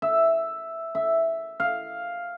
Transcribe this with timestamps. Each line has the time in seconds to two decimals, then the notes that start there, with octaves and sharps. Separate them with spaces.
0.02 E5
0.95 E5
1.60 F5